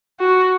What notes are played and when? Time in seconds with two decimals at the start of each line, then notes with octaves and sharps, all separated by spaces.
0.20 F#4